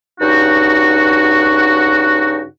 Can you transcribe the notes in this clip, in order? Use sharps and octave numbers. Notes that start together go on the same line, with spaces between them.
G2 C#3 D#4 F#4